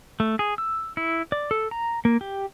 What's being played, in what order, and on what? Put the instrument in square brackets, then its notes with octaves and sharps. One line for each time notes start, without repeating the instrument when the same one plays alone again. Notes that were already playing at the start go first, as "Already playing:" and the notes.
[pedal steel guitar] A3
G#4
E6
E4
D5
A4
A#5
A#3
G4